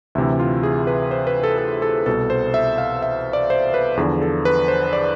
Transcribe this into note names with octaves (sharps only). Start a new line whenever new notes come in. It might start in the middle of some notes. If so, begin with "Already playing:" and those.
D2 C3 E3 E5
F4
G#4
B4
C5
B4
A4
A4
A4
C2 B2 A4
C5
E5
F5
E5
D5
C5
B4
E2 D3 F3 G#4
A4
B4
C5
D5